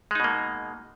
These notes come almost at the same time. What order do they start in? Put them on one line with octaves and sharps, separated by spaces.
G#3 D#4 B2 A#3